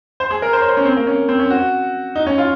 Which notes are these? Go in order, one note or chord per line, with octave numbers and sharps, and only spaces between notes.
C5
G#4
A#4
C5
C#5
C5
C#4
C4
A#3
C#4
C4
C#4
F#4
D#4
C#4
F4